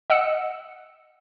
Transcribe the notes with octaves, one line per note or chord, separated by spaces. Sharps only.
D#5 F#5 E6 C#7